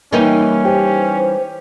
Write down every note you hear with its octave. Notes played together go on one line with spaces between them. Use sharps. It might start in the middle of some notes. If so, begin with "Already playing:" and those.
E3 G3 A#3 C#4 D#4
G4 C5